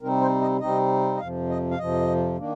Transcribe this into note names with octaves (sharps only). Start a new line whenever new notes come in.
C3 G3 C4 D#4 A#4
C5
D#5
C3 G3 C4 D#4 D#5
D#5
F2 C3 F3 F5
D#5
F5
F2 C3 F3 D#5
D#3 A#3 D4